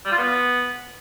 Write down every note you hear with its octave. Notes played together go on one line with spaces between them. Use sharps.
G3
F4
B3